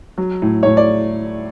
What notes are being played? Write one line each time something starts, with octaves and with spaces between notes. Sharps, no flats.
F#3
A2
A2 C#5
D5